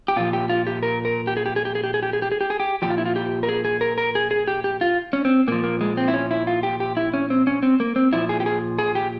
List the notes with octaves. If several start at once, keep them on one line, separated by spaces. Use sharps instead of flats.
G4
A#2 F3 F4
G4
F4
G4
A#4
A#4
G4
G#4
G4
G#4
G4
G#4
G4
G#4
G4
G#4
G4
G#4
G4
G#4
G4
A#2 F3 G4
F4
E4
F4
G4
A#4
G#4
G#4
A#4
A#4
G#4
G#4
G4
G4
F4
C#4
C4
A#2 F3 A#3
A#3
G#3
C4
E4
C#4
E4
F4
G4
G4
E4
C#4
C4
C#4
C4
A#3
C4
A#2 F3 E4
G#4
G4
G#4
G#4
G4